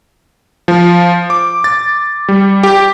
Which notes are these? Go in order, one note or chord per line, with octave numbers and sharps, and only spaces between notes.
F3
D6
A6
G3
G4